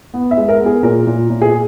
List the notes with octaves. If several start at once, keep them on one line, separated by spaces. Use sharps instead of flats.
B3
E5
G#3
A#4
B3
G#4
A#2 A#4
A#2
A#2
G#4